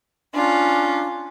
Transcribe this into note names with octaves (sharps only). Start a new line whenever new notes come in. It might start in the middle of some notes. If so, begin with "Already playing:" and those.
C#4 D4 F4